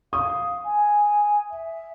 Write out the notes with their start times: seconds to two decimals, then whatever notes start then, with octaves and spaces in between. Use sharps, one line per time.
0.13 F5 D#6
0.63 G#5
1.50 E5